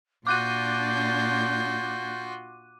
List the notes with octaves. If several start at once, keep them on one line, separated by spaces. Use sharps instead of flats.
A#2 D4 F4 F#4 D6 F#6 G6 D#7